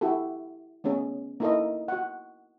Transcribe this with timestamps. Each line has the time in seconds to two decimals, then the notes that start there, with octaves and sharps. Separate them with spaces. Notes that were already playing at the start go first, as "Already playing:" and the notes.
0.01 E4 F#4 G4 A4
0.84 A3 B3 C#4 G#4
1.40 A#3 D#4 E4 A4 A#4 D#5
1.88 F#4 F#5